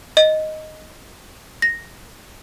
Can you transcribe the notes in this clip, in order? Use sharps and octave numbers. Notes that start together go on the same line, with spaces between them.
D#5
A#6